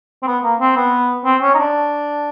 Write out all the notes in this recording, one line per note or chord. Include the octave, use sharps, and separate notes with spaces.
C4
B3
A#3
C4
B3
C4
C#4
D#4
D4